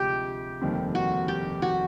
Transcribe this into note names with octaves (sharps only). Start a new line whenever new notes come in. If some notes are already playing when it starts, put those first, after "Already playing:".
Already playing: D2 C3 F3 G#3 G4
F1 D#2 D#3 G3 C4
F#4
G4
F#4